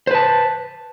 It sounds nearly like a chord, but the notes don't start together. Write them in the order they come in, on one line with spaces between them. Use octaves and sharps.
C5 B4 A5